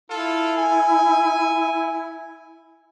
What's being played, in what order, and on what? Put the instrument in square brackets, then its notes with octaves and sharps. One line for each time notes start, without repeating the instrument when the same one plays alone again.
[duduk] E4 [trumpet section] F4 A4
[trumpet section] G#5